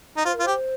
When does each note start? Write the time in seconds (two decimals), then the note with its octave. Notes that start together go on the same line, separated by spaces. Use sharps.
0.17 D#4
0.25 F4 C5
0.34 A#4
0.39 F4
0.43 G4 C5